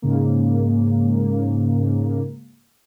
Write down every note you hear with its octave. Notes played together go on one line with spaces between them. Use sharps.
G#2 C#3 A#3